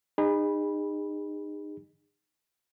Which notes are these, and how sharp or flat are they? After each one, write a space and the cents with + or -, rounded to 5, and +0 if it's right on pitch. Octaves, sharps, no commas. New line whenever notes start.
D#4 -30 G#4 -35 B5 -10